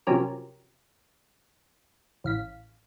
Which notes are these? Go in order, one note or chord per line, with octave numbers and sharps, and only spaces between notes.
C3 F3 F#3 C#4 G4 A#4
A1 F5 B6